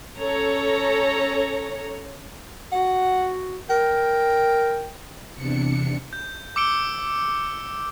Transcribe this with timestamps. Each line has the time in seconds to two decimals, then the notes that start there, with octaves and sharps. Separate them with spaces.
0.18 C#4 A4 C#5 A#5
2.72 F#4 F#5
3.70 A#4 G5
5.35 E2 C3 D4 C#7
6.13 G6
6.56 D6 E6 C#7 D7 G7